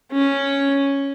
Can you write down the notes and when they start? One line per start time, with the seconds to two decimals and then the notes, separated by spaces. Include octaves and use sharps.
0.12 C#4